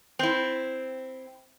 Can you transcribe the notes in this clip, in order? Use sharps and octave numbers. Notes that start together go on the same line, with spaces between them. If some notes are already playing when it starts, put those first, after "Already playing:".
C4 E4